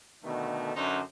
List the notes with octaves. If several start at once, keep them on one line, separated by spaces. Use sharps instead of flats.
B2 D3 D#3 A3
F#2 D3 C#4 D#4 C5